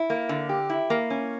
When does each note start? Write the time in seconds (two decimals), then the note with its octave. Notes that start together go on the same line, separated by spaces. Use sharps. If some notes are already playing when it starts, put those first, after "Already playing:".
Already playing: E4
0.10 A#3
0.29 D3
0.49 G4
0.70 E4
0.90 A#3
1.10 C#4